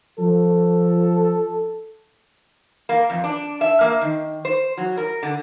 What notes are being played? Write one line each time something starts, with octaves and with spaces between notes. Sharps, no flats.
F3 A4
A#3
F2
D4
E5
A#3
D#3
C5
F#3
A#4
D3